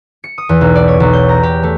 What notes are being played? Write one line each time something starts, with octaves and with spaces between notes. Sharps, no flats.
C#7
D#6
E2
B1
D5
C#5
B1
G6
A#5
G4
A3